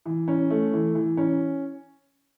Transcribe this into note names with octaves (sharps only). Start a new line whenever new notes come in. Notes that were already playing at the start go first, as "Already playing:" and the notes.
E3
C#4
A3
E3
E3
C#4